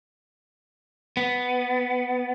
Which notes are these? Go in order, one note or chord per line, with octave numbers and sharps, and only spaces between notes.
B3